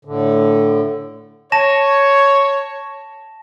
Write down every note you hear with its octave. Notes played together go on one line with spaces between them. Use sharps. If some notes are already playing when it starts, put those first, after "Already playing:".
A2 D3
C#5 A5 A#6 E7